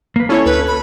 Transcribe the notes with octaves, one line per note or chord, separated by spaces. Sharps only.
A#3 B4
C#4 E4 A4 C#5
D2 B4
B5